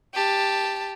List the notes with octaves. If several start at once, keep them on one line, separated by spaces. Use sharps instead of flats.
G4 A5